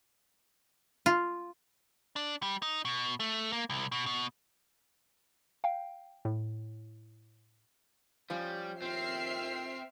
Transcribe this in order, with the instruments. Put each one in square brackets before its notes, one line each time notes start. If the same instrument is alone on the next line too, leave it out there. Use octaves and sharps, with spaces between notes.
[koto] F4
[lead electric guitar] D4
G3
D#4
B2
A3
A#3
C2
B2
B2
[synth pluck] F5 G5
A2
[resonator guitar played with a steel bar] F3 C#4 [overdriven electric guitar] G3
[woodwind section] D#2 A2 F4 [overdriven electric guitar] C4 [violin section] E5 F6 C7